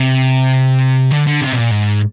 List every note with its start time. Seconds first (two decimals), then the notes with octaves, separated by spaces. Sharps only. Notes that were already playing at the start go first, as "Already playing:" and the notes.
Already playing: C3
1.11 D3
1.27 D3
1.41 C3
1.53 B2
1.57 A#2
1.71 G#2